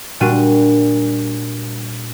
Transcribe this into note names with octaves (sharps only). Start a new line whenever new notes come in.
A#2 G3 D4 F#4 D#7